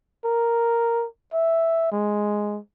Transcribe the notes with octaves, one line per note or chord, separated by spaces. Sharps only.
A#4
E5
G#3